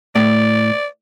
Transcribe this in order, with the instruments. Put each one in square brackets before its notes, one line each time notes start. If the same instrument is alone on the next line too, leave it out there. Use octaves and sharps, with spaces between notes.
[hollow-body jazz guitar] A2 [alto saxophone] D5